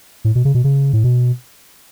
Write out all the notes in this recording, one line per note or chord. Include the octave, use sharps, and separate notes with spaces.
A2
B2
C#3
B2
C#3
A2
B2